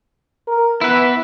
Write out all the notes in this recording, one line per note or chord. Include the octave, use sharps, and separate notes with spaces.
A#4
B3 E4 B4